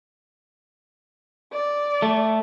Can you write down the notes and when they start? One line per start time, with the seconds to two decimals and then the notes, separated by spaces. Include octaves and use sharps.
1.53 D5
2.02 A3